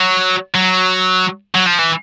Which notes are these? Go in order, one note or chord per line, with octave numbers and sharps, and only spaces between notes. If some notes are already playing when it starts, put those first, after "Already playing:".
Already playing: F#3
F#3
F#3
F3
E3